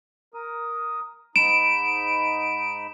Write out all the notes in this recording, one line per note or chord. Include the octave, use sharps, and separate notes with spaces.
A#4 D#6
G#2 D#4 B5 D7 E7